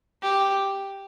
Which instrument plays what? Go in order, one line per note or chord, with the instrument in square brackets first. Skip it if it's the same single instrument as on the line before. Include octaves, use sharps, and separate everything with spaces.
[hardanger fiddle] G4